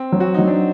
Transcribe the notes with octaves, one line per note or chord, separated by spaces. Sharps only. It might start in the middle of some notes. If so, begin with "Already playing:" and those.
Already playing: C4
F#3
F#4
F#3 D#4
D4